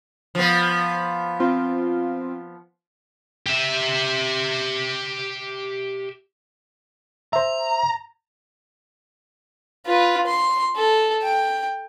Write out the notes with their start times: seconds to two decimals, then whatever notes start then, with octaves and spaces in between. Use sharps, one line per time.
0.35 F3 B3
1.40 C4 F4
3.46 G4 E5
7.33 C5 E5 A#5
9.86 F4 B4
10.27 C6
10.76 A4
11.23 G5